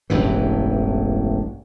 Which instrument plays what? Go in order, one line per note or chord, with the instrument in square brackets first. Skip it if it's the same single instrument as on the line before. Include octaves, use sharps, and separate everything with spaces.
[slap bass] E1 A1 G2 E3